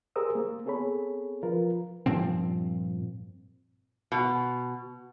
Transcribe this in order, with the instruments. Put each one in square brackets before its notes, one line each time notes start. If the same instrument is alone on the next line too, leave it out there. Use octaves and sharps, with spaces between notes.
[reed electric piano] G4 G#4 A#4 C5 D#6 E6
A#3
B3 C4 G#4 A4 C#5 B5
F3 F4 A#4 B4
[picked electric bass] G2 A#2 F3 C4
[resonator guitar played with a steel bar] B2